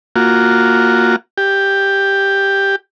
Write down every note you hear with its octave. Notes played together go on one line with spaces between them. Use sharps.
A#3 F4 F#4
G4